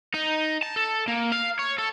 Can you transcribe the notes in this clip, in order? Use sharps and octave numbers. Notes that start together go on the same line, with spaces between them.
D#4
A5
A4
A#3
F5
C#5
A4